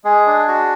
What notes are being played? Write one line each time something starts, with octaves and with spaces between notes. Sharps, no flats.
G#3 G#4
D4
F#4